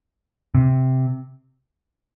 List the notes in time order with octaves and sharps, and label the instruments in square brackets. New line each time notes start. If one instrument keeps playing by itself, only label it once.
[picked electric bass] C3